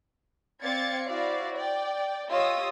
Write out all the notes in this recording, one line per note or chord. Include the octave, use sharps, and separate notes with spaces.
C4 D5 F5 G#6 A6 C#7
E4 F#4 C5 D5 F5
D5 G5
F4 G4 C#5 D#5 D#6 E6